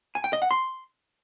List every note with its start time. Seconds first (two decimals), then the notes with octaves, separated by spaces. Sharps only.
0.15 G#5
0.24 G5
0.33 D#5
0.42 F#5
0.51 C6